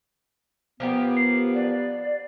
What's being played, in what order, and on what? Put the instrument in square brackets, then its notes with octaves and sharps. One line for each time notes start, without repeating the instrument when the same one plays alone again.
[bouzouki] F3 A#3 G4 [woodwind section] B3
[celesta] C7
[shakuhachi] D5